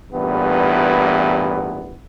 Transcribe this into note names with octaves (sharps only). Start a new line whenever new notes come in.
A1 E2 G2 A#2 E3 B3